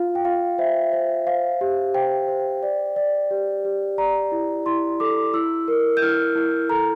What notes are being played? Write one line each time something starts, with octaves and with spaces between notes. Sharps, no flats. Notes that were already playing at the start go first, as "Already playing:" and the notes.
Already playing: F4 F5
G5
F4 F5
C5 E5
C5
C5 F5
G4
C5 G5
C5
D5
D5
G4
G4
D5 A#5
E4
E4 C6
A4 D6
E4 E6
A#4
G6
E4 F6
E4
A4 A#5